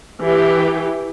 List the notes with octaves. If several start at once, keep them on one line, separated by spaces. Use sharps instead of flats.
E3 G4